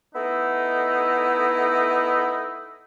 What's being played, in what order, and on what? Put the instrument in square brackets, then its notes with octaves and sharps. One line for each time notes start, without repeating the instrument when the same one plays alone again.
[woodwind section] A3 B3 D#4 E4 D#5 E5